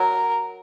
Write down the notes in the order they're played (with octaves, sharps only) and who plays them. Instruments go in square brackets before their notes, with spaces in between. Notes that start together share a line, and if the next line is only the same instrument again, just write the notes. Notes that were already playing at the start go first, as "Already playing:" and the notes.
Already playing: [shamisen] F#3 [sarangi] A#4